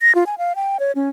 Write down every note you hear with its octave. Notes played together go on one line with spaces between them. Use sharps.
A#6
F4
G#5
F5
G5
C#5
C#4